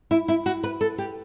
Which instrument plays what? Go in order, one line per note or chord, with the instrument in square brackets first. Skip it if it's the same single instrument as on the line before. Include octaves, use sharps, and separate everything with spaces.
[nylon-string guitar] E4
E4
F#4
B4
A4
G4